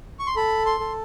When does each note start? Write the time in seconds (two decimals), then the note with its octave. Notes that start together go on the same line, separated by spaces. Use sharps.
0.19 C#6
0.27 C6
0.36 A4 B5
0.66 C6
0.80 A4